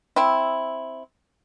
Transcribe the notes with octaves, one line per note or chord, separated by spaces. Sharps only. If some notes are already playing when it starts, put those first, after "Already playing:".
C4 E4